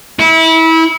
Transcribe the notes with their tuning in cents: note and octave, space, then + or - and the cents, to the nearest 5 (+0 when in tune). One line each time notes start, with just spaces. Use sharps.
E4 -25